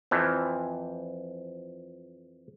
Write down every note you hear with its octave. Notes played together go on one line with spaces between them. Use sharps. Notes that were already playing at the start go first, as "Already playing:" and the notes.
F2 E3 F3